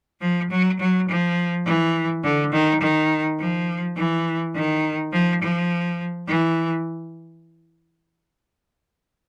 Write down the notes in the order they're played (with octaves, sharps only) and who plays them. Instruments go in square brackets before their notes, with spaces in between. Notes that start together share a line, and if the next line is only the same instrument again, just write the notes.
[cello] F3
F#3
F#3
F3
E3
D3
D#3
D#3
F3
E3
D#3
F3
F3
E3